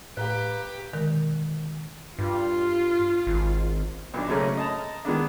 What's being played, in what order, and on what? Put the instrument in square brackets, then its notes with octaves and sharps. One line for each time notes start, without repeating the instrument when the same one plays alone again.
[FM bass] A2 [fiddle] G4 [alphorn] B4 [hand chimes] F5 A#5 F#6
[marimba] B2 D3 D#3 G#3 A#4
[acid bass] G2 [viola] F4
[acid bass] G#1
[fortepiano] B1 B2 D4
F#2 C#3 A3 A#3 C#4
D#5 A5 A#5
D#3 G#3 B3 D4